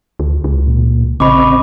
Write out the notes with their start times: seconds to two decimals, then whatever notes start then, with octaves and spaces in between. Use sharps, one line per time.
0.19 D2
0.44 C#2
0.67 A#2
1.20 A1 C#3 C4 D#5 B5 C#6 D6